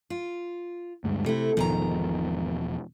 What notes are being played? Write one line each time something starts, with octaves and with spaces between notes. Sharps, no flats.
F4
D2 G2 G#3
C3 A3 E4
E1 G#2 B2 D#3 F3 A#5